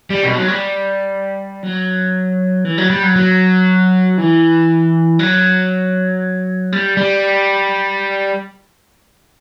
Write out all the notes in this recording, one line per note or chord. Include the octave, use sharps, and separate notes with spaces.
G3
B2
F#3
G3
F#3
E3
F#3
G3
F#3
F#3
E3
F#3
G3
G3